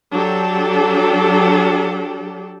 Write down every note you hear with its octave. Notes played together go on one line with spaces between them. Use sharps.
F#3 D4 G4 A4